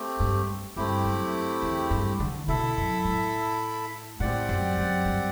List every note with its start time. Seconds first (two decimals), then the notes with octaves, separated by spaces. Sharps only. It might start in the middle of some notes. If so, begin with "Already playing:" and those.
Already playing: A3 C4 G4
0.20 G2
0.76 G2 A3 C4 E4 G4
1.04 F#2
1.62 E2
1.91 G2
2.20 D3
2.48 B2 E4 A4 E5
2.77 F#2
3.05 A2
4.20 A2 C4 G4 D5 F#5
4.49 F#2
4.78 F#2
5.05 G2